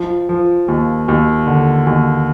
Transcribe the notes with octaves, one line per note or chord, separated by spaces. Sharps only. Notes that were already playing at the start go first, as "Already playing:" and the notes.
Already playing: F3
F3
D#2
D#2
D3
D#2